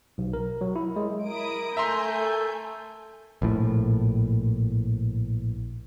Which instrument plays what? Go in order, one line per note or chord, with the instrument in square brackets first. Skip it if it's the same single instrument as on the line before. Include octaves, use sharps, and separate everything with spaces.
[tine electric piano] B1
A#4
F#3
E4
G#3
[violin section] E4 D#6 D7 [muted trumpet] A#4
[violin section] A3 G#5 G6 [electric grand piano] E5 A#5 C6
[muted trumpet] A4
[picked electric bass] A#1 A2